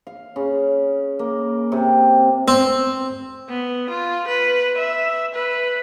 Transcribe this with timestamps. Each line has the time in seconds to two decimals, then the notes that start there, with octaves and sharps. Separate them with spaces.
0.07 F5
0.36 C#3
1.19 A#3
1.72 C3
2.48 C4
3.50 B3
3.90 F4
4.28 B4
4.78 E5
5.35 B4